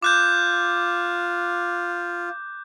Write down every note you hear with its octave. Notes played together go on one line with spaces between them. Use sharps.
F4 D6 F#6 G6